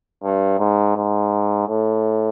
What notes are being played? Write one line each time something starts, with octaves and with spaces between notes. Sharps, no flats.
G2
G#2
G#2
A2